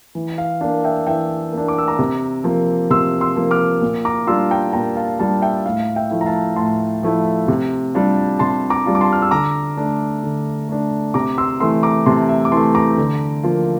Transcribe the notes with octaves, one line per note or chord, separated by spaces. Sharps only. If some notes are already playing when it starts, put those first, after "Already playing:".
E3
F5
A#3 D4 F5
E5 G5
E3 E5 G5
A#3 D4
D6
E6
A#5 D6
C3
F3 A#3
C3 C6 E6
C6 E6
F3 A#3
D6 F6
A#2
A#5 D6
G3 D4 F4 C6 E6
G5 A#5
A#2 G5 A#5
F5 A5
G3 D4 F4 F5 A5
E5 G5
A2 F5
E5 G5
F3 A3 E4
A#5
F5 A5
A2 A5 C6
F3 A3 E4
C3
G3 D4 F4
C3 A5 C6
A#5 D6
G3 D4 F4
D6
A5 C6
F6
E6
D3 A#5 D6
A3 D4
D3
A3 D4
C3 A#5 D6
C6 E6
E3 A3 C6 E6
A#5 D6
C3 A5 C6
E5
D6
E3 A3 A5 C6
A#5 D6
D3
F3 A#3 F4